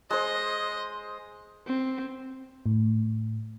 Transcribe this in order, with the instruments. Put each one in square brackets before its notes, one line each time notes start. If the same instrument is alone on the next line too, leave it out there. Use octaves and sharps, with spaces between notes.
[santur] G#3 C5 [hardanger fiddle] D#5
[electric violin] C4
[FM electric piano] A2